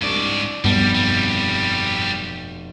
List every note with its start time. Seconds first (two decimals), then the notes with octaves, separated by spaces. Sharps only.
0.02 C2 G#2 D4 D5 C#6
0.64 F1 G2 B2 G3
0.95 F2 G3